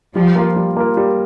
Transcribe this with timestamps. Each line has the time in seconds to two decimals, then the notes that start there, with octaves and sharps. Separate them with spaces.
0.16 F3 G3
0.36 A#3 F4 A#4
0.56 G3
0.76 A#3 F4 A#4
0.97 G3